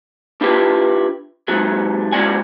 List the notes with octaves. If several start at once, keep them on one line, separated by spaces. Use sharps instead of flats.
D4 E4 F4 G4 B4
G#2 C3 F#3 A3
A2 G#3 C#4 F#4 D5 G#5